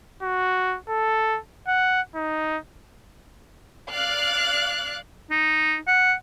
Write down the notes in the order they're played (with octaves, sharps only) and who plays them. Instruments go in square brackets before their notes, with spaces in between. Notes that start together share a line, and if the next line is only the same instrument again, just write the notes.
[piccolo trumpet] F#4
A4
F#5
D#4
[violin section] D5 F5 F#6
[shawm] D#4
F#5